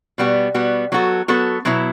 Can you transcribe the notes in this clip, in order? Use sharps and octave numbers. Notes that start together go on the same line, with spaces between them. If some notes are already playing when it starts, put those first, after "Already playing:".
B2 G3 B3 F#4
B2 G3 B3 F#4
F#3 B3 F#4 A4
F#3 B3 F#4 A4
B2 F#3 B3 E4